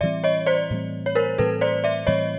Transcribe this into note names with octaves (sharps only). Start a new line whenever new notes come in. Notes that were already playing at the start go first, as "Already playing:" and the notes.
A2 E3 G3 C4 D5 E5
C#5 D#5
C5 D5
A2 E3 G3 C4
C#5
A#4 C5
A2 E3 G3 C4 A4 B4
C5 D5
D5 E5
A2 E3 G3 C4 C#5 D#5